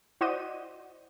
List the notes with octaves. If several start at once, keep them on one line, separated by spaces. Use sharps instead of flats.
E4 F#4 C5 D5 D#5 D#7